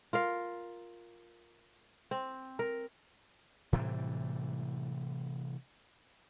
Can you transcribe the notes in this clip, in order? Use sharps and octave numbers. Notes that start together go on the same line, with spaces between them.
F4 A#4 F5
C4
A#4
A2 C3 E3 G3